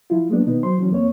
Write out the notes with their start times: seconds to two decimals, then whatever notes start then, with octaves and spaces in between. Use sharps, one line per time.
0.10 F3 E4 F4
0.29 F#3 G#3 A#3 B3 D4
0.46 B2 D#3 B3 D#4
0.63 F#3 C5 C6
0.78 E3 F#3 C#4
0.91 F2 A#3 C4 C#5